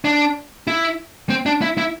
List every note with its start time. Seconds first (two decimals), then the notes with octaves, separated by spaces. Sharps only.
0.04 D4
0.67 E4
1.30 C4
1.46 D4
1.62 E4
1.78 E4